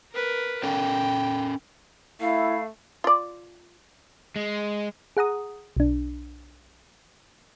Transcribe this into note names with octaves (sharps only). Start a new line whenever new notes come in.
A#4 B4
C#4 A4 A#4 G5
A3 E4 F5
F4 D5
G#3
G#4 F#5 A#5 D#6
B1 D4